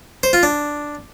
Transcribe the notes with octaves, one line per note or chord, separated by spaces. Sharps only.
C5
F4
D4